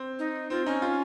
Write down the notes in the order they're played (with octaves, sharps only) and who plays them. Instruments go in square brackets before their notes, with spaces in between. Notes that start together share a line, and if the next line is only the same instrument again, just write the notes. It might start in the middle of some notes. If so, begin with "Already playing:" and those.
Already playing: [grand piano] C4
[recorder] D#4
[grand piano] C4 [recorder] F4
[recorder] C#4 [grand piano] D#4
[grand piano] F4